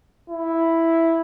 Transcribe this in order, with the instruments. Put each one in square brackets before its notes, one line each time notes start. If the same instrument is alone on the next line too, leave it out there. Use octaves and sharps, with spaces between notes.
[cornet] E4